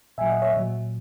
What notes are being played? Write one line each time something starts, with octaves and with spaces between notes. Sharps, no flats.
A#2 F#3 E5 G#5
D#5 F#5
C#5 E5
A#2 F#3